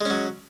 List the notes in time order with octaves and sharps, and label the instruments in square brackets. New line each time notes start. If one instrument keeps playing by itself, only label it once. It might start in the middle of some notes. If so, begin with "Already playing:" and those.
[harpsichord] G#3
C#4
F#3